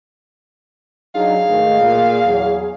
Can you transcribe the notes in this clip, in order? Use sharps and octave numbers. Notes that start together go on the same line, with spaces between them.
F#3 D4 D#4 G#4 F5
G#2 D#3 A3
A#2
E2 F#3